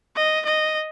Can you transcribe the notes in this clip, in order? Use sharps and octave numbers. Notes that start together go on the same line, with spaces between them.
D#5
D#5